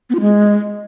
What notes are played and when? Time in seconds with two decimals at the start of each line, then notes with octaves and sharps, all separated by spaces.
0.10 B3
0.15 F4
0.20 G#3